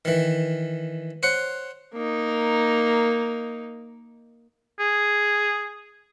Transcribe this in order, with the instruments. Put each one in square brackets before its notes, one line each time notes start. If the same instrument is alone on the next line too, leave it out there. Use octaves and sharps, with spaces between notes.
[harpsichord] D#3 E3
C5 C#5 F#5
[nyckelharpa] A#3 D#4
[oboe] G#4